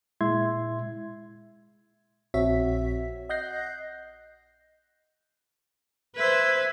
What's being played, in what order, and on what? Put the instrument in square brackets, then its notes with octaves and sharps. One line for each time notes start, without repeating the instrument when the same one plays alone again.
[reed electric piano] A#2 G#3 E4 E5 C6 G#6
[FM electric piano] A#1 C4 F#4 C#5 E5 B6
D#5 F#5 F#6 G6 A#6 C7
[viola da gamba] B4 C5 [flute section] E5 G#6